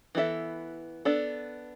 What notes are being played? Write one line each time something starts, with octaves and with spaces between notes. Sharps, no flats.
E3 B3 E4 A4 E5
B3 D4 A4